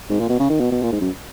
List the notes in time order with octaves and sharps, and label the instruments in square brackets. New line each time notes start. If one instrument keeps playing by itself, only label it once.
[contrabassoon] G#2
A#2
B2
C#3
D#3
B2
B2
A#2
G#2
F#2